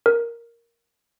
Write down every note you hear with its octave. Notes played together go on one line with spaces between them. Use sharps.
A#4